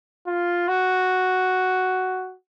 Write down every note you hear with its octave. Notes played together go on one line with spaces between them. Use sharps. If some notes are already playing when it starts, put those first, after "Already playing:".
F4
F#4